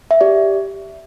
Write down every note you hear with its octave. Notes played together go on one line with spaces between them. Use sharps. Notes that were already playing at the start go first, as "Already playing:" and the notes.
E5
G4 D5